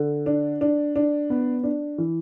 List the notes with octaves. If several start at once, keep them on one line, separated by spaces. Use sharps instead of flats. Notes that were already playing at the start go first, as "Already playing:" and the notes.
Already playing: D3
D4
D4
D4
B3
D4
E3